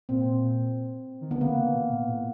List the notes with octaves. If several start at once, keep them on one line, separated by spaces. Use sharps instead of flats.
A#2 C4
D#3
D3 B3
C#3 A#3
D#3
B2
A#2
A2